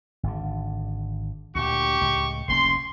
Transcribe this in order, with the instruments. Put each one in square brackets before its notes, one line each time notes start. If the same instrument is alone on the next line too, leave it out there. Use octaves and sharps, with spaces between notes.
[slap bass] G#1 D3
[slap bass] D2 A#2 [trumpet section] G4 C#6
[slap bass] C#2 A2
[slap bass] F1 A#3 C#4 [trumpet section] C6